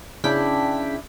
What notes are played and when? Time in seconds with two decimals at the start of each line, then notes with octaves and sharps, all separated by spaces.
0.24 C#3 D4 E4 G5 B6